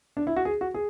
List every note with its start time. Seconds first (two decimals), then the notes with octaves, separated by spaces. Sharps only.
0.17 D4
0.27 E4
0.36 F#4
0.45 G#4
0.61 F#4
0.74 G#4